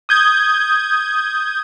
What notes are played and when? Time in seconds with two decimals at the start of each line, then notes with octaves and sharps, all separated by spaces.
0.09 D#6 G6 G#6